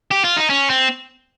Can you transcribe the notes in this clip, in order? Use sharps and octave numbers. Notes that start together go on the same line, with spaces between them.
G4
F4
D#4
C#4
C4